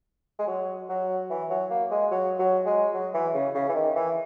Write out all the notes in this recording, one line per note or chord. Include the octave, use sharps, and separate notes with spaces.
G#3
F#3
F#3
E3
F#3
A#3
G#3
F#3
F#3
G#3
F#3
E3
C#3
C#3
E3
D#3
E3